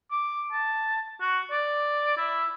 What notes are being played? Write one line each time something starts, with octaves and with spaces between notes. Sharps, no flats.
D6
A5
F#4
D5
E4